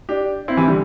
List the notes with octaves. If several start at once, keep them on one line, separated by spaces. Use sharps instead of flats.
D4 G4
C4 E4
C3 E3
D3 G3